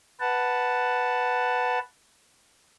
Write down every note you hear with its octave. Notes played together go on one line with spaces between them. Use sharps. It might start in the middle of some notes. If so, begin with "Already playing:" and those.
B4 F#5 A5